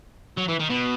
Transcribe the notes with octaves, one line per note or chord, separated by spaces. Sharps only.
F#3
E3
D#3
B2